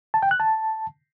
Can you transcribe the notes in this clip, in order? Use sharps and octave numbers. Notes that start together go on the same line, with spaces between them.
A5
G5
F#6
A5